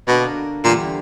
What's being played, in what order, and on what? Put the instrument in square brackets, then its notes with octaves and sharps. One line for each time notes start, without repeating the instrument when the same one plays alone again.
[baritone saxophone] B2 [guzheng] D3 A#3 D4 A#4
[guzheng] E2 D3 G3 [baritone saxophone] A#2